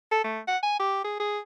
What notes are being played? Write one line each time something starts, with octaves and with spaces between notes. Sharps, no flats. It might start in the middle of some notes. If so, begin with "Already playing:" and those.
A4
A3
F#5
G#5
G4
G#4
G#4